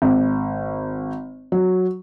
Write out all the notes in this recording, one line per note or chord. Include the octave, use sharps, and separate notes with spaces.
G#1
F#3